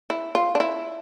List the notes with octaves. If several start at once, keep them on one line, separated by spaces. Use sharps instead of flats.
E4
F4
D4
E4